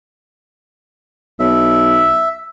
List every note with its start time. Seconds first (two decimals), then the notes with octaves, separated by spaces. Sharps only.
1.40 B1 E5